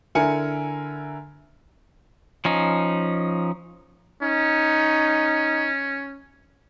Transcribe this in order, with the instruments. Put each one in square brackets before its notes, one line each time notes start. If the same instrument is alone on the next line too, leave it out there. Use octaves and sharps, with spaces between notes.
[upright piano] D3 E4 A#4 G#5 C#7
[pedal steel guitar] F3 C#4 D#4
[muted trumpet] C#4 [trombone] D#4